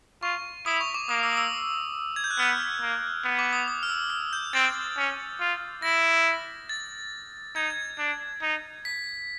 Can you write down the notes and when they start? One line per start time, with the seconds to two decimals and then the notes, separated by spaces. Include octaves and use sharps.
0.22 F4 C#6
0.66 E4 D#6
0.81 C#6
0.94 D6
1.09 A#3 D#6
1.23 E6
1.33 D#6
1.37 E6
2.16 G#6
2.24 G6
2.31 F#6
2.38 B3 F6
2.81 A#3
3.24 B3
3.39 D6
3.53 D#6
3.68 D#6
3.83 F6
3.90 E6
4.10 F6
4.33 G6
4.53 C4 A6
4.97 C#4
5.40 F4
5.82 E4 A#6
6.69 A6
7.55 D#4 G#6
7.70 G#6
7.98 D4
8.42 D#4
8.85 B6